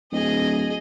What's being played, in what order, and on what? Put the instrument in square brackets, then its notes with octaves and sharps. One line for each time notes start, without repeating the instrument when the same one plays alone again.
[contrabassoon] D1 [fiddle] G#4 D#5